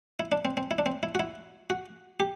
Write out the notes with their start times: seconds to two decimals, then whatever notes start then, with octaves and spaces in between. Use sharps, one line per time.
0.20 E4
0.32 D4
0.45 C4
0.57 C4
0.71 E4
0.78 D4
0.86 C4
1.03 E4
1.15 F#4
1.20 E4
1.70 F#4
2.20 G4